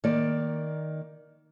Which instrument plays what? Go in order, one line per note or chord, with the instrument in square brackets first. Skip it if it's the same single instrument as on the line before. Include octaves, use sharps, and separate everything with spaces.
[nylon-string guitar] D#3 A#3 D5